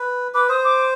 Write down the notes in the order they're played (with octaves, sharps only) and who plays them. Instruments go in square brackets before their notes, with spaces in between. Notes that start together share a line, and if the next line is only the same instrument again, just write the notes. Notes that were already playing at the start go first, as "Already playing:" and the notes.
Already playing: [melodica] B4
[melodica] B4 [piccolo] D6
[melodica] C5 [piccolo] D#6
[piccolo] D6